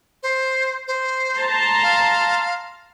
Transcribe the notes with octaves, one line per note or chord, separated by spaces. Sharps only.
C5
C5
A5 A#5 C6
F5